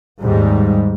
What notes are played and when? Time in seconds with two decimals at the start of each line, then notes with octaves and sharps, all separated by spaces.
0.22 D#2 G#2 G3